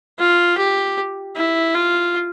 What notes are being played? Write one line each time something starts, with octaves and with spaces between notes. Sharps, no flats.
F4
G4
E4
F4